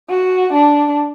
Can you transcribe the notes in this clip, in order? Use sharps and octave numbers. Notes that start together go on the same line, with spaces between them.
F#4
D4